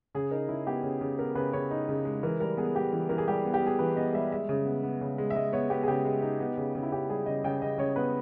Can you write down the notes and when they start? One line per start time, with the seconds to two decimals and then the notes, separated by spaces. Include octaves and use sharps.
0.15 C#3 G#4
0.31 D#4 A#4
0.49 C#3 E4
0.67 B3 G4
0.83 C#3
1.01 C#3
1.18 B3 A#4
1.35 C#3 B4
1.53 C#3 C#5
1.71 D#4
1.89 C#3
2.05 G#3
2.23 E3 A#4
2.40 G3 A#4
2.57 B3 G#4
2.75 G3 G4
2.93 E3
3.09 E3 A#4
3.18 G#4
3.27 G3 G4
3.45 B3
3.54 G4
3.62 B3 G#4
3.79 E3 B4
3.96 B3 D#5
4.13 G3 E5
4.32 G#3 E5
4.49 C#3
4.66 B3
4.83 B3
5.01 C#3
5.18 G#3
5.30 E5
5.35 G#3 D#5
5.53 B3 C#5
5.70 B3 G4
5.83 G#4
5.88 C#3 G4
6.05 G#3
6.22 D#4
6.40 B3
6.57 C#3
6.75 C#3
6.83 E4
6.92 C#3 G4
7.09 G3 G#4
7.26 C#3 D#5
7.44 C#3 G5
7.62 C#3 D#5
7.78 C#3 C#5
7.96 B3 B4